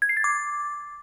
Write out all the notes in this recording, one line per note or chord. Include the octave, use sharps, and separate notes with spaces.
G#6
C7
A6
D6